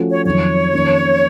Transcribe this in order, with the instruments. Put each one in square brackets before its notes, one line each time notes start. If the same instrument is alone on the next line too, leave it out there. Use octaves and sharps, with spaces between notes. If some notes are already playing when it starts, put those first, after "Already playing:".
Already playing: [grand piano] F3 A3 C#4 F#4
[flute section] C#5
[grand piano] F2 D#3 F#3 [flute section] C#5
[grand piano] F2 D#3 A#3 C#4